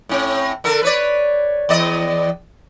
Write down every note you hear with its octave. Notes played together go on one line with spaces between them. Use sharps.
A2 C4
D3 A4 A#4
B4 C#5 D5
E2 D5 D#5